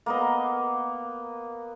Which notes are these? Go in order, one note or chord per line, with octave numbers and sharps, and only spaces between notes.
A#3 B3 D#5